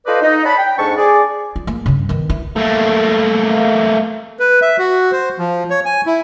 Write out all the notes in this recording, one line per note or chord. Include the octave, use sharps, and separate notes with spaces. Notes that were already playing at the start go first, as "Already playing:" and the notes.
F4 A4 B4 C5 D5 D#5
D#4
C#5 D5 F#5 A5 B5
G5
F2 G#2 D4 A5 C#6
G#4 D5
F4
A#3
G2 C#3
D#3 B3
E4
A3 A#3
B4
E5
F#4
C5
F3
C#5
G#5
E4